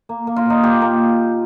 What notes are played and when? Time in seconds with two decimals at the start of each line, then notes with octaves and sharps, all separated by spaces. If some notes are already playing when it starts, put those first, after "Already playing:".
0.09 A#3
0.27 A#3
0.36 F4
0.46 A#2 D#4
0.64 A#2 G4
0.82 A#3